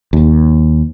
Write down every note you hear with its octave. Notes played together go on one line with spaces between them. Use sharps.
D#2